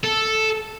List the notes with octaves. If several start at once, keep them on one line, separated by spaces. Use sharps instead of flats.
A4